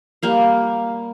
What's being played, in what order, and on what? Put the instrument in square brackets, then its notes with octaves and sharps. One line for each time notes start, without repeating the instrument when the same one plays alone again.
[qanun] G3 A#3 F5